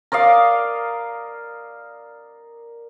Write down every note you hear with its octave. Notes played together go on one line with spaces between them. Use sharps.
A#4 D5 D#5 F5